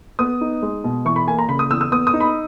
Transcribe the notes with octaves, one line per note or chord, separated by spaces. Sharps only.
B3 D#6
D#4
G#3
B2
E3 C#6
B5
A#3 G#5
A#5
C#3 B5
D#6
E2 E6
E6
B3 D#6
D#6
D#4
B5